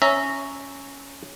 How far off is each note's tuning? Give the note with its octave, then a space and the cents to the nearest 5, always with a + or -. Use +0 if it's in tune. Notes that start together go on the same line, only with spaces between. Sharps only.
C#4 +0 E5 -10 A#5 -15